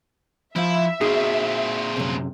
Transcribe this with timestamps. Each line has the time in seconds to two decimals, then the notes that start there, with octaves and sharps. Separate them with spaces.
0.56 F3 E4 E5 F5
1.01 A#2 C4 D#4 F#4 G#4
1.97 F#2 C3